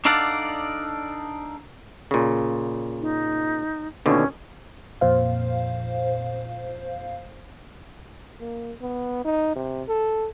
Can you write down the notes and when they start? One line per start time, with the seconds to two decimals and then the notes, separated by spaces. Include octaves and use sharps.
0.05 D4 D#4 A4 D5 F5 F#5
2.11 A#2 C#3
3.01 D#4
4.06 D#2 B2 D3 C#4
5.01 F2 A#2 C5 F5
8.40 A#3
8.81 B3
9.24 D#4
9.56 C3
9.88 A4